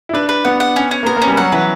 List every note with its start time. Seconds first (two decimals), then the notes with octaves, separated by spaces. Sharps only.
0.09 E4
0.13 D4 B4
0.29 B4
0.45 B3 F#5
0.60 F#5
0.76 C#4
0.91 C#4
1.03 A#3
1.06 B3 A#4
1.17 A#3
1.22 C#4
1.27 G3
1.37 F#3 F#5
1.52 E3 B4